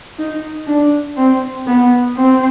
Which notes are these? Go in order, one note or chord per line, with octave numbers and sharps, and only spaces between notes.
D#4
D4
C4
B3
C4